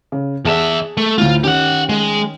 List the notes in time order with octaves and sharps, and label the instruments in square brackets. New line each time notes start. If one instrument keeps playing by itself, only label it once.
[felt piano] C#3
[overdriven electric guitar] E2 E5 [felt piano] G#4 A5 E7
[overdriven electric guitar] A3
[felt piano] D2 A2 [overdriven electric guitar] F4
[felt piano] D#3 C#4 [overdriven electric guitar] G4 F#5
[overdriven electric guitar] G#3